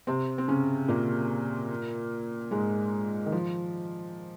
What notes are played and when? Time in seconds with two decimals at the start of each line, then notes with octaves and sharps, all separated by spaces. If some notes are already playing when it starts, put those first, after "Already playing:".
0.07 C3 C4
0.38 C4
0.48 C#3 C#4
0.88 A#2 A#3
2.51 G#2 G#3
3.26 D#3
3.32 F3